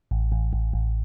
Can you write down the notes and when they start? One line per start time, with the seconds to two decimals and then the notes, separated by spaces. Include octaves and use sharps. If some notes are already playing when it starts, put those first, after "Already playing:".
0.11 A1
0.32 A1
0.53 A1
0.73 A1